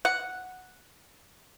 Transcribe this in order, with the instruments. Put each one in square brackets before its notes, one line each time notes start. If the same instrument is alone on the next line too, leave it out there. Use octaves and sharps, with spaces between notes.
[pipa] F#5